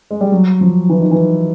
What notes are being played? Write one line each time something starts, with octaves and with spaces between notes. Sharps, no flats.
G#3
G3
F#3
F3
E3
D#3
E3